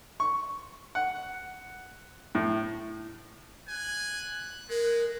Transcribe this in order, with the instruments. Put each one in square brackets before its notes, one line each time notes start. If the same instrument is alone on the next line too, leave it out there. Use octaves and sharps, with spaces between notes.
[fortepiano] C#6
F#5
A2
[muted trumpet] G#5 [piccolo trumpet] F#6
[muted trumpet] G#3 [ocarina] A#4